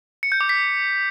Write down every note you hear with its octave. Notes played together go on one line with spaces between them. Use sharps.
C#7
G6
D6
B6